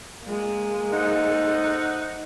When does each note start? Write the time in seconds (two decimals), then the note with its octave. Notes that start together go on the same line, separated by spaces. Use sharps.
0.23 G#3 A#3
0.93 C3 D#4 A4 F#5